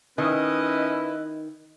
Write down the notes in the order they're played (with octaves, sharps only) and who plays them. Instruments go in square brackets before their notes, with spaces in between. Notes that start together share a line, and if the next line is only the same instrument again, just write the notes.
[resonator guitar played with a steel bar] D#3 [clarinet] C#4 [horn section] E4 B4 [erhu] D#5